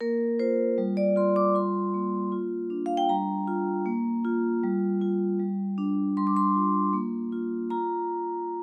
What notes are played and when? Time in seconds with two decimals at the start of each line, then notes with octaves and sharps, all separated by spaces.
0.01 A#3 A#4
0.39 F4 C5
0.78 G3
0.97 D5
1.16 F4 C6
1.36 D6
1.55 F4 C6
1.94 A#3
2.32 F4
2.70 D4
2.86 F5
2.97 G5
3.09 G3 A#5
3.48 F4
3.86 A#3
4.25 F4
4.64 G3
5.01 F4
5.40 G3
5.78 D4
6.17 G3 C6
6.27 D6
6.36 C6
6.56 F4
6.93 A#3
7.32 F4
7.70 F4 A#5